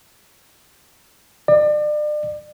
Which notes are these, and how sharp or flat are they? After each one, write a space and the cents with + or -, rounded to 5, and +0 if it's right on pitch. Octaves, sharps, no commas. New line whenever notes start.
D5 +35